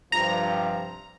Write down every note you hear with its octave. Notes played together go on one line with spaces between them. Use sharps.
G2 C3 F3 A#5